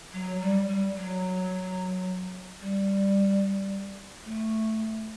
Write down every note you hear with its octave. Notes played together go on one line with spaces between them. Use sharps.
F#3
G3
G3
F#3
G3
A3